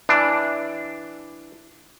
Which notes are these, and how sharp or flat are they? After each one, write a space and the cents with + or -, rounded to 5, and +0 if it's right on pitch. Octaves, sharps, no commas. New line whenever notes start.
E3 +0 D4 +0